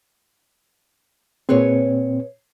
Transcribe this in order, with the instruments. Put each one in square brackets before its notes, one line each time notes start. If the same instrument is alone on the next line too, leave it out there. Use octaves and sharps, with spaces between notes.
[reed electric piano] A#2 C4 [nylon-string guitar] G#4 B4 C#5